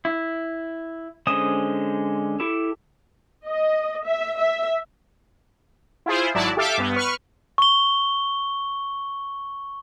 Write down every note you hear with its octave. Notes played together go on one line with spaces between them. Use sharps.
E4
D3 G#3 C#4 C5 D#6
E4 G4 A4
D#5
E5
E5
E4 F4 G#4 C5
G#1 F#3 E4 D5 A5
G4 A4 E5 F5 D6
G2 B3
B4 C#6 F6
C#6 G7